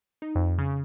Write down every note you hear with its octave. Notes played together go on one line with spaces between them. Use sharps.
D#4
F2
C#3